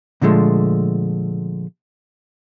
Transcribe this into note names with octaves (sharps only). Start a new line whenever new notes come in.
A#2 D3 F3 G#3 A3